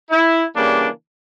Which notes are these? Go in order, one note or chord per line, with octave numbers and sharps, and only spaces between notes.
E4
C#3 E3 G3 A#3 D4